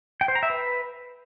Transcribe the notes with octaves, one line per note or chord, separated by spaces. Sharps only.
G5
C5
A#5
E5
B4